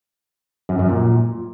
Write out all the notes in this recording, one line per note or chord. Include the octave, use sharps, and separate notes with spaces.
F#2
F#2
A#2